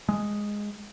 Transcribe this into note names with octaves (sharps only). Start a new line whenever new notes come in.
G#3